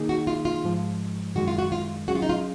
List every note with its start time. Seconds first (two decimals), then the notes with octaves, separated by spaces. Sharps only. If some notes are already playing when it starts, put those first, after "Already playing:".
Already playing: D#3 A#3 D#4 G#4
0.09 F#4
0.27 F4
0.45 F4
0.64 G#2 F3 G#3
1.35 F#2 D#3 G#3 F#4
1.48 F4
1.59 F#4
1.72 F4
2.08 F#3 C#4 F#4 G#4
2.15 F4
2.22 D#4
2.29 F4